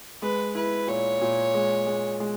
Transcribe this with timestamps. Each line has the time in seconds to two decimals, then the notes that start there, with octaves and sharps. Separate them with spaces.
0.22 G#3 B4
0.55 E4 B4
0.87 A#2 C#5
1.21 A#2
1.54 G#3
1.87 G#3
2.20 G#3